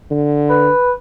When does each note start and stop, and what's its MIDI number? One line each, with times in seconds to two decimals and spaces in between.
0.11 0.70 50
0.50 0.91 71